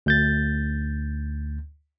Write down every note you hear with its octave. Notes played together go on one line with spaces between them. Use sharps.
D2 G6 A6